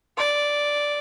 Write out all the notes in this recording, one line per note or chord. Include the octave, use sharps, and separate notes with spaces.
D5